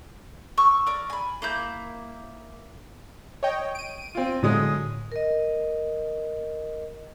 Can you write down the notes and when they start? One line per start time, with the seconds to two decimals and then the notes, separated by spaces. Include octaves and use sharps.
0.58 C#6 E6
0.87 A#4 D5
1.10 G#5 B5
1.42 A#3 E4 G6
3.43 C#5 D#5 G5
3.75 D7 D#7
4.15 C4 F4
4.43 A2 D3 F#3 G#3 D#6
5.12 A#4 D#5